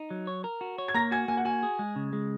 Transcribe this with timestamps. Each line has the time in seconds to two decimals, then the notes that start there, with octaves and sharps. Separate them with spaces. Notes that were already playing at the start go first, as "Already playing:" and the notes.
Already playing: D#4
0.10 F#3
0.27 C#5
0.44 A#4
0.61 F#4
0.78 C#5
0.88 G#6
0.94 A#3 A#5 A#6
1.11 F#4 G#5 G#6
1.28 A#3 G#5
1.37 F#5
1.45 F#4 G#5
1.63 G#4
1.79 G#3
1.96 C#3
2.13 G#3